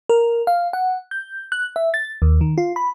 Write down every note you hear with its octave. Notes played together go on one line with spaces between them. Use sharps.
A#4
F5
F#5
G6
F#6
E5
A6
D#2
D#3
F4
B5